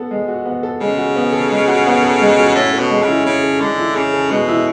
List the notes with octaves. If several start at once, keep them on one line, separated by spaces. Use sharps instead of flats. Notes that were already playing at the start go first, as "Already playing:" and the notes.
Already playing: B3 A4
G#3
F#4
B3
A4
C#3 G#3
F#4
B3
A4
G#3
F#4
B3
A4
G#3
F#4
A2 C#4
A4
B2
G#3
C#3
E4
C#3 C#4
A4
D3 G#3
E4
C#3 C#4
A4
B2 G#3
E4